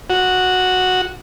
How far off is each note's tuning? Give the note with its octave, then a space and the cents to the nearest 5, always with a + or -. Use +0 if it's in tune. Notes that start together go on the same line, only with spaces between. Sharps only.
F#4 -5